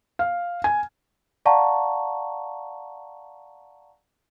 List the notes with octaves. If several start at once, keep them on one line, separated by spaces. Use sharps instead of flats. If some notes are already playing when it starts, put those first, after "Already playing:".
F5
G#5
D5 F5 F#5 A5 A#5 C#6